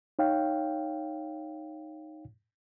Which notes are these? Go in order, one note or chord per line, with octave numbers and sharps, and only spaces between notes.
D#4 C#5 F5 G5